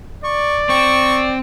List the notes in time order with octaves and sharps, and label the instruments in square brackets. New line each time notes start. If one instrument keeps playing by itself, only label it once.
[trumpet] D5 [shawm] C#6
[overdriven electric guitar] C4 [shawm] C#6